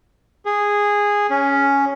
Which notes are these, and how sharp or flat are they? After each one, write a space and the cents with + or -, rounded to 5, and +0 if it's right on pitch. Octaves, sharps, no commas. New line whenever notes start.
G#4 -10
C#4 +5